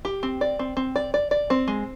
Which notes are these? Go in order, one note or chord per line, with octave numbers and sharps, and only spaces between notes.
G4
C4
D5
C4
C4
D5
D5
D5
C4
G#3